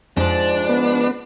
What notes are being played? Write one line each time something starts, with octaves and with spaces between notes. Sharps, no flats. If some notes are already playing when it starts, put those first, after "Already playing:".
F2 G#2 F3 D4
B3